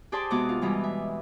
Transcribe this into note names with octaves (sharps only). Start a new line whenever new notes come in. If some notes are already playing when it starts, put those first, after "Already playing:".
G4 G#4 C5 D5 A5 C6
C3 G#3 B3 F#4 D6
F4
B2 E3 G3 G#3
E5